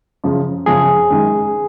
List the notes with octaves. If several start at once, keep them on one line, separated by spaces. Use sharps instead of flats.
F#2 C#3 F3
F#2 C#3 F3 G#4
F#2 D#3 G#3